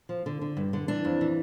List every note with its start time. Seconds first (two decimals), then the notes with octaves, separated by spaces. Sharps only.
0.09 F3
0.26 D3
0.41 D3
0.57 G2
0.73 D3
0.88 E3 D4
1.05 F2
1.21 E3